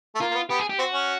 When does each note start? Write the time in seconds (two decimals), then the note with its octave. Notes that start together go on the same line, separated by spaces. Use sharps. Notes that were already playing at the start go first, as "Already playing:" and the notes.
0.15 A3
0.21 A#3 F4
0.31 A#3
0.35 B3
0.50 B3 G4
0.59 G#4
0.69 G4
0.79 C4 F#4
0.93 C#4